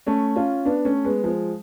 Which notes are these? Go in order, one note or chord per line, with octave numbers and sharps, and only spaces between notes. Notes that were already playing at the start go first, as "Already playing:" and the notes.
A3 C#4
C#4 F4
B3 D4
A3 C#4
G#3 B3
F3 G#3